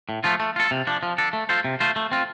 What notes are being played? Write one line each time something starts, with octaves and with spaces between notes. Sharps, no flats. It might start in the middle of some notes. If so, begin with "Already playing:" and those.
A2
F3 A3 F4
A3
F4 A4
C3
F3 D4
F3
D4 A4
A3
F4 A4 C5
C3
A3 F4 C5
A3
C4 F4